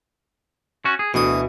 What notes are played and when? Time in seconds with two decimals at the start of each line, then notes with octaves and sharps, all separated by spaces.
0.85 C#4 F#4
0.99 G#4
1.14 D2 B2 E3 D#6